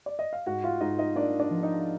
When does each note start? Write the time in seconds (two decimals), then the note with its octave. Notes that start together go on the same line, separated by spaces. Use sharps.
0.06 D5
0.19 D#5
0.33 F5
0.46 G#2 F#4 F#5
0.64 F4 F5
0.81 G#2 D#4 D#5
0.99 D#4 D#5
1.16 A#3 D4 D5
1.40 D4 D5
1.51 F3
1.63 D#4 D#5